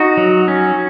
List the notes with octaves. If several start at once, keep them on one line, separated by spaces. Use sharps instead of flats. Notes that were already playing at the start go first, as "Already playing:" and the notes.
Already playing: D#4 F#4
F#3
C#4